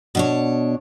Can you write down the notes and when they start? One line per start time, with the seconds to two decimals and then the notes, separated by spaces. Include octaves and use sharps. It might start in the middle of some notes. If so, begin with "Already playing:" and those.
0.15 B2 D4 C#5